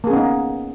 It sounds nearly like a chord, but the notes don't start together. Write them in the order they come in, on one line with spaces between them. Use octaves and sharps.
A#3 G#4 C#4 B3 D#4